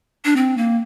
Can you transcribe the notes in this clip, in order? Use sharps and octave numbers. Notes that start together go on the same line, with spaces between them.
D4
C4
A#3